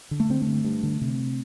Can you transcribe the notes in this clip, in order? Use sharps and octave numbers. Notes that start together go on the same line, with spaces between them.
D3
A3
D3 C4
G2 A3
G2
D3
C3